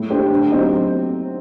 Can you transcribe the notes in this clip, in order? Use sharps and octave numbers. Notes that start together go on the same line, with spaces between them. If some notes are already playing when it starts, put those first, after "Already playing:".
Already playing: A2
A3 D4 G4 C5
D3
F#3 C4 D#4 G4